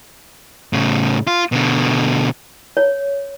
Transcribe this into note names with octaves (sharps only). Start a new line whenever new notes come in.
A2 C#3
F4
B2 D3
C#5